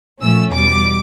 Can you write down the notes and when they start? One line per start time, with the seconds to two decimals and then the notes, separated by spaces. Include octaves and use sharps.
0.21 A#2 F3 A3 C#4 E6
0.52 E2 B2 G3 D6